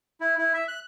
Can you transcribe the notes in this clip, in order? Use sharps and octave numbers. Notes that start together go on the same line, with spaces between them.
E4
E4
E5
F#6